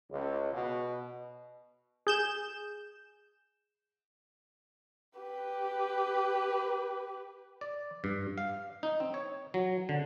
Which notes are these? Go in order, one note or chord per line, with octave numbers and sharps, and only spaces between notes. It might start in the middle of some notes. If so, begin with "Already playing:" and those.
C#2
B2
G#4 G6 E7
G4 B4
D5
G2
F5
D#4
C4
C#5
F#3
D3